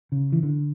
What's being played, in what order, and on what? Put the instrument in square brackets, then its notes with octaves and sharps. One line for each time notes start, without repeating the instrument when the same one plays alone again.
[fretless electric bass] C#3
E3
D3